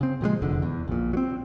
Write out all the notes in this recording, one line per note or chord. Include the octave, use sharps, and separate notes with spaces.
C#3 C4
A#2 F3 F#3 G#3
F1 E2 D3
E2
A#1 A#2
F#3 C4